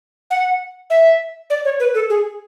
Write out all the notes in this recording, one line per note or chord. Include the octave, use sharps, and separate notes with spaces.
F#5
E5
D5
C#5
B4
A4
G#4